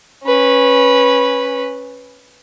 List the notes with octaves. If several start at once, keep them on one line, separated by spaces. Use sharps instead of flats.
C#4 B4